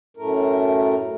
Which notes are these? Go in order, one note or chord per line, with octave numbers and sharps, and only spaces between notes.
F#2 A2 A3 A#4